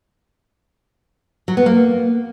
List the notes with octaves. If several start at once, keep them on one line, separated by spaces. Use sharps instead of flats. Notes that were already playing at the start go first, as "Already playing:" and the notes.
F#3
B3
A#3